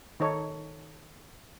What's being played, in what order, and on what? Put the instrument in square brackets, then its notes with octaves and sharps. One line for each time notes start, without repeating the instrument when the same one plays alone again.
[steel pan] D#3 D#4 A4 C#5